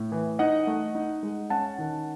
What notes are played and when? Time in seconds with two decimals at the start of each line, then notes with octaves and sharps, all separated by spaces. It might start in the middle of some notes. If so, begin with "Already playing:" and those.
Already playing: A2
0.12 E3
0.39 D#4 D#5 F#5
0.67 A3
0.95 D#4
1.23 G#3
1.50 C#4 F#5 A5
1.78 D#3